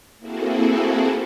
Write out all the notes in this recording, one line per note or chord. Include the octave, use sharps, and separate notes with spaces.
A#3 C4 E4 F#4 G#4 A4